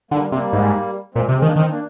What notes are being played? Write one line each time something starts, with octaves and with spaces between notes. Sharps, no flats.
D3 G3 A#3
C3 G3 A#3
G#2
A#2 G#3 C4
C3
G#3 C4
D#3
A#3 D4
D#3 C4 D#4
A#3 D4